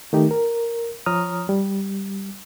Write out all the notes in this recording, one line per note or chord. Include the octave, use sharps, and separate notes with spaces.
D#3 A3 D#4 G4
A#4
F3 C#5 A#5 D#6 F6
G3